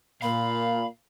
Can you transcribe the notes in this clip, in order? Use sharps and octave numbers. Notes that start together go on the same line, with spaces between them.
A#2 F5 B5